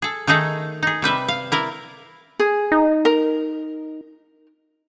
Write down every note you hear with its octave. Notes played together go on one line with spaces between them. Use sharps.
G#4 A4
D#3 A3 D#4 G#4 A4
D#4 G#4
C3 G3 B4 E5
F5
E4 A#4 D5
G#4
D#4
A#4